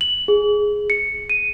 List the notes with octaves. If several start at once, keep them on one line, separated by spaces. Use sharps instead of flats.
F#7
G#4
C#7
D#7